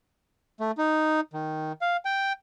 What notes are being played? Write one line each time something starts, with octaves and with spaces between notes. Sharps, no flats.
A3
D#4
D#3
F5
G5